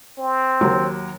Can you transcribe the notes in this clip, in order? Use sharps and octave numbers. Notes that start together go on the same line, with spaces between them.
C4
D#2 F#3